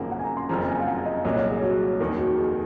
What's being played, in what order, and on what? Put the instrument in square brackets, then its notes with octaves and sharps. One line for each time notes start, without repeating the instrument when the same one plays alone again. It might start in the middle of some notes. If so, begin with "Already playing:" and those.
Already playing: [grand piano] G#1 F#2 C#3 F3 A#3 [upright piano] F#5
[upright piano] F#5
G#5
A#5
C6
[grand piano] F#1 F2 C#3 F3 [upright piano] A#5
[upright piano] G#5
F5
F#5
D#5
[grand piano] C2 A#2 F#3 [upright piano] D#5
[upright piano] C#5
G#4
F#4
[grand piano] F1 D#2 D#3
[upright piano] F#4
G#4